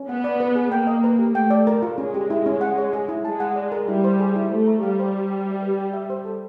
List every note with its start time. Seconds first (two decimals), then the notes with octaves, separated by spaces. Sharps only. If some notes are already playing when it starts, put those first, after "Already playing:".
Already playing: C#4
0.08 B3 F#5
0.24 D5
0.40 B4
0.55 G#4
0.72 A#3 G5
0.87 D#5
1.04 B4
1.19 G4
1.35 A3 G5
1.50 D5
1.67 A#4
1.82 F4
1.98 G#3 C#4
2.14 G4
2.30 E4
2.46 C#4
2.61 F#5
2.78 C#5
2.93 G#4
3.09 E4
3.25 G#3 A5
3.40 F#5
3.56 D5
3.72 A#4
3.88 G3 E4
4.04 C5
4.20 G#4
4.36 E4
4.51 A3 C5
4.67 A#5
4.83 G3 F5
4.99 C5
5.15 A#5
5.30 G5
5.47 E5
5.62 B4
5.78 G5
5.93 E5
6.10 C5
6.25 A4